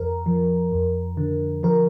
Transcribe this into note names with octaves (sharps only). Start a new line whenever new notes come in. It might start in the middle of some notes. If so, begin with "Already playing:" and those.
Already playing: F2 A#4
F3
F2
D3
F3 A#4